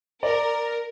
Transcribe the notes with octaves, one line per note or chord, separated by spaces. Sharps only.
A#4 D5